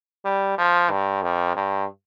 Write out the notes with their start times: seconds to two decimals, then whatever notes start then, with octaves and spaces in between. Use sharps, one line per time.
0.25 G3
0.58 F3
0.91 G2
1.22 F2
1.56 G2